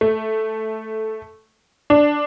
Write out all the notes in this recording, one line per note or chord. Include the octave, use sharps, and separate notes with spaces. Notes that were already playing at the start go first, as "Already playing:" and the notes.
A3
D4